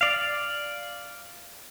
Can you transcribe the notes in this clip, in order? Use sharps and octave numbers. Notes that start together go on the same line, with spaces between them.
D5 F5